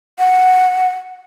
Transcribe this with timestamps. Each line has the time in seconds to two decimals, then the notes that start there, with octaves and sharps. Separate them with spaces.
0.19 F#5